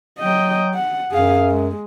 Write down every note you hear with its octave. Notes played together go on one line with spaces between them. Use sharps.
F#3 D#5 G5
F#5
F#2 G#4 F5
G#3